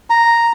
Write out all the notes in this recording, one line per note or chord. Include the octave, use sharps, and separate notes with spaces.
A#5